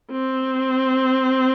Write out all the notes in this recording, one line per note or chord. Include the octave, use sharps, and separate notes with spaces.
C4